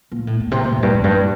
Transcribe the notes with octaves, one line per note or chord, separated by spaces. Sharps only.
A#2
A2
A#2
C3
A#2
F2
G2
F2
G2